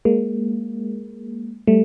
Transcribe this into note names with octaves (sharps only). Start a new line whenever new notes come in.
G#3 A#3
G3 A3